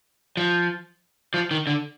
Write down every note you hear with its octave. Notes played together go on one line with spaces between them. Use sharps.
F3
F3
D#3
D3